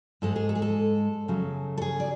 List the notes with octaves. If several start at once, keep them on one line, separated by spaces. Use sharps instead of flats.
G#2 G#3 A4
G#4
A4
G#4
A4
F#2 C#3 F#3
A4
G#4
D5